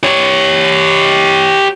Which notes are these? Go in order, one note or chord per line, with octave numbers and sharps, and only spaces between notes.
G4 C#5